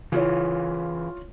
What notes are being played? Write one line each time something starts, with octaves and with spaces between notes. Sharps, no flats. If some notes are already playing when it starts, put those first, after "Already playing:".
C#3 E3 E4 F4 C#5